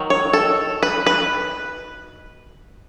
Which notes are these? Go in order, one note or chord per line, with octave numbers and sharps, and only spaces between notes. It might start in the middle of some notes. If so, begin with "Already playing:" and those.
Already playing: D#3 F#3
C#5
A4
B4
B4